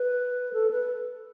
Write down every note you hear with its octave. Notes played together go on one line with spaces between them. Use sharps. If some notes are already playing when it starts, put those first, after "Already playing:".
Already playing: B4
A4
B4